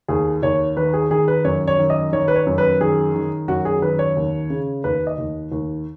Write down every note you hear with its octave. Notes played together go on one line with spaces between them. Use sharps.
D#2 G#4
D#2 C#5
D#3 B4
G#4
D#3 G#4
B4
F#2 C#5
C#5
D#3
D#5
D#3 C#5
B4
C#5
F#2
B4
D#3 G#4
D#3
F#2 F#4
G#4
D#3 B4
C#5
D#2
C#3
D#2 B4
D#5
D#2
D#2